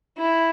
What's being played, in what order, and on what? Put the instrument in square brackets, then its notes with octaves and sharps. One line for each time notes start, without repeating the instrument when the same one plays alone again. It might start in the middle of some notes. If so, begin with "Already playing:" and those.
[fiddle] E4